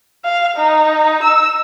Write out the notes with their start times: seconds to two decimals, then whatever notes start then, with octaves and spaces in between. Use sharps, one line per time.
0.25 F5
0.57 D#4
1.23 E6